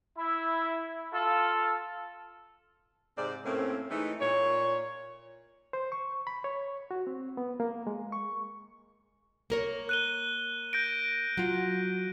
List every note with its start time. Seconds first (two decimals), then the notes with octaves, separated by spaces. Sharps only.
0.17 E4
1.13 F4 A4
3.18 G#2 C3 C4 D5
3.45 A2 A3 A#3 C4 C#4
3.90 E3 G#3 A3 D#4
4.21 A#2 C#5
5.73 C5
5.92 C#6
6.27 B5
6.44 C#5
6.91 F#4
7.07 C4
7.37 B3
7.60 A#3
7.87 G#3
8.12 C#6
9.50 A#3 A#4 C#5
9.89 F#6 D#7 G7
10.73 G6 A#6 D7
11.37 F#3 F4